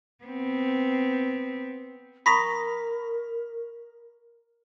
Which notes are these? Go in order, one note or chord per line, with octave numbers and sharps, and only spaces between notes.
B3 C4
A#4 A#5 B5 C#6 D#6 A#6 B6